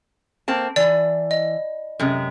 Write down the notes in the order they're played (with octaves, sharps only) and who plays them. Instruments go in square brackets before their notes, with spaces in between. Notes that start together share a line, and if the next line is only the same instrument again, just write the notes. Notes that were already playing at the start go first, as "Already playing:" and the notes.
[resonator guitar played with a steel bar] A#3 C4 A5
[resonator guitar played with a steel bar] E3 [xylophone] D5
[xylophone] D#5
[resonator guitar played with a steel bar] F#2 C3 G#3